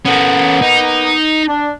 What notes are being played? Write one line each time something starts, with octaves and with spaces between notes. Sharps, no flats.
A#3 B3 C#4 A4
D#4
D4